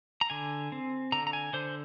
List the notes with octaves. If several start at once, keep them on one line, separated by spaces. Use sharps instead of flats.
A#5
D3 G#5
C4
D3 A#5
A#5
G#5
D3 C5